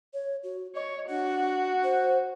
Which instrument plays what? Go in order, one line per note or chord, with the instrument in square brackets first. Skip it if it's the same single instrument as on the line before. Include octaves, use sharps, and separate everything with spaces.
[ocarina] C#5
F#4
[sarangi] C#5 [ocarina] D#5
[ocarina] D4 [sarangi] F#4
[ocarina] C5